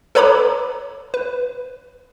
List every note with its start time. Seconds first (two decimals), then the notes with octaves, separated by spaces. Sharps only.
0.15 A4 B4 C#5 A#5 B5 D6
1.14 B4